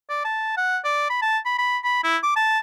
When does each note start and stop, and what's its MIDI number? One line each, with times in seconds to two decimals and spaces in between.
0.09 0.23 74
0.25 0.56 81
0.57 0.78 78
0.84 1.08 74
1.10 1.22 83
1.22 1.38 81
1.45 1.57 83
1.59 1.78 83
1.84 2.04 83
2.04 2.17 64
2.23 2.36 86
2.36 2.59 81